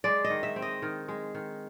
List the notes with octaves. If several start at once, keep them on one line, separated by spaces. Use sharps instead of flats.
G#3 D5
D#5
D#3
E5
C4
D#5
D#3
G#3
D#3